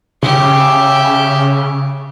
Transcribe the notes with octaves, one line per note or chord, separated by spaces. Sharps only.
C#3 G4 E5